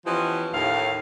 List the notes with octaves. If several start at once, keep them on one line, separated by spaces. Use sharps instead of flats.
E3 F3 B3 C#4 G4 D#5
D#2 A2 F5